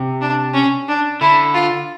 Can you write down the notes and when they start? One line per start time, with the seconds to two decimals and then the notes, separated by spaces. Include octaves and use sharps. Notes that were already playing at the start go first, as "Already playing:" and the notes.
Already playing: C3
0.21 D4
0.54 C#4
0.88 D4
1.21 D3 E4
1.54 F4